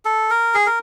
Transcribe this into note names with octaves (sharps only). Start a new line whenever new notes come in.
A4
A#4
G#4
A#4